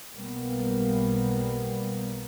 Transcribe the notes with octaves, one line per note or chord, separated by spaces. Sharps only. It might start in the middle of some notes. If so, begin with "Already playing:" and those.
B1 G3 A#3 B3